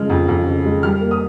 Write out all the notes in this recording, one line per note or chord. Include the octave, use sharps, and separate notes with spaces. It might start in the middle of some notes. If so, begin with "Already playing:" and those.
Already playing: C#3 F3 G#3 F6
F2
F2
C#3
G#3
G3 F6
A#3
D#6